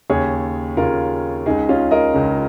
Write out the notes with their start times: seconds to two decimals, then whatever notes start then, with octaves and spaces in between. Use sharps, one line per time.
0.10 D#2 C#3 G#4 C#5
0.77 D#2 C#3 F4 A#4
1.46 C#2 C#3 D#4 G#4
1.69 C#4 F4
1.91 A#4 D#5
2.14 C#2 C#3